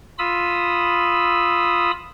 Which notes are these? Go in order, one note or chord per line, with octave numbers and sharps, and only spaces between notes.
F4 B5 D#6 E6